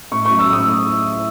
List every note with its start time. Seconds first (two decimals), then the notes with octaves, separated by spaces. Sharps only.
0.12 A2 C#6
0.26 F#3 C#6
0.39 E6
0.48 A2
0.53 D#6